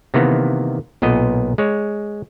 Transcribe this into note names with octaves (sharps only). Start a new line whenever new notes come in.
C3 D#3 E3 A#3 B3
B1 A#2 B3 D#5
G#3 C#5